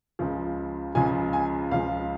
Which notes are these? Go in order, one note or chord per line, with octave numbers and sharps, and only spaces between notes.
C#2 C#3 F3
C#2 C#3 F3 G#5
G#5
C#2 C#3 F3 F5